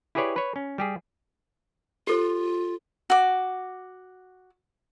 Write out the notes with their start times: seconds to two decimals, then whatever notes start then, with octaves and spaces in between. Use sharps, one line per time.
0.15 E4 G4 G#4 B4 C#5 D5
0.36 B4 C#5
0.56 C#4
0.78 G3 G4 G#4
2.07 F4 G4 A4 C5
3.10 F#4 D6